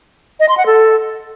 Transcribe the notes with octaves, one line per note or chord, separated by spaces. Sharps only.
D#5
C6
F#5
A4